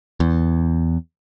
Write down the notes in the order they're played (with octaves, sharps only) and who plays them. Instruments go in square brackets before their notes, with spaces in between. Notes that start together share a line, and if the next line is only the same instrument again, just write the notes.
[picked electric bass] E2